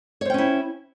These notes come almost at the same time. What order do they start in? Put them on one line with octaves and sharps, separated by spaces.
C#5 C5 G5 C#4 E4